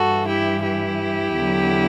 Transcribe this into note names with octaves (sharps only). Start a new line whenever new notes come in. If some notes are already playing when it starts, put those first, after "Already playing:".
Already playing: G2 E3 F#4 A4
E4 G4
E4 G4
E2 D3 F#3